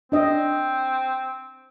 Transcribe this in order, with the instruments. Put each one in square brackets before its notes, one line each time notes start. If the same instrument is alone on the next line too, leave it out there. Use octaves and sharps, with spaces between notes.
[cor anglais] C4 [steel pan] D4 D#5